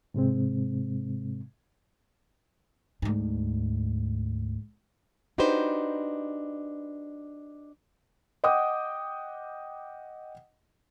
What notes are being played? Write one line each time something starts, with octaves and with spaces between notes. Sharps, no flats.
G#2 C3 G#3 C4
D2 G#2
D4 D#4 F#4 G4 B4 C5
D#5 F#5 G5 D6 D#6